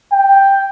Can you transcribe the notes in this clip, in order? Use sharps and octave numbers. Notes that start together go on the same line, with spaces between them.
G5